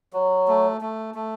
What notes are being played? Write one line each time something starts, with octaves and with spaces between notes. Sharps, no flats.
F#3
A3
A3
A3